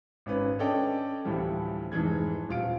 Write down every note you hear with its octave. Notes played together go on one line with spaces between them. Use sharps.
G#1 C#4 B4
C#4 D4 A4 D5 D#5 G5
D2 A2 E3 F3 G3
F1 G#2 E3 G#4 G#6
D#1 F4 D7